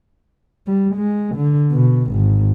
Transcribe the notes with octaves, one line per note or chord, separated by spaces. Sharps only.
G3
G#3
D3
B2
G#1